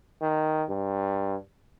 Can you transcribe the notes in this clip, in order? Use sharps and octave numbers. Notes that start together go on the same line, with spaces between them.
D#3
G2